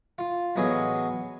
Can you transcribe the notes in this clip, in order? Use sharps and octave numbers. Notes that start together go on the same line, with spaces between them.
F4
A1 F#3 B3 G#4 D#5 G#5